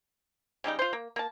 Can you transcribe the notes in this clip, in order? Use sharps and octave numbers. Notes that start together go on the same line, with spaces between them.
C#3 G3 D#4 G4
F4 C5
A#3
A#3 A5